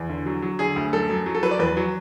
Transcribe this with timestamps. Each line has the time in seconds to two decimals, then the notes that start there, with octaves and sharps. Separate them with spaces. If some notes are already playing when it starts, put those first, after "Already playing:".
Already playing: E2
0.10 D3
0.26 F#3
0.42 F#3
0.59 D3 G#4
0.76 D2
0.93 F#2 A4
1.09 F#2
1.26 F#3
1.35 A4
1.43 F#3 B4
1.51 D5
1.59 E2 B4
1.77 F#3